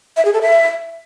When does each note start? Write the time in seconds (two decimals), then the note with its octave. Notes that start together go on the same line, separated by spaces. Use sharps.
0.17 E5
0.25 G#4
0.33 A4
0.42 E5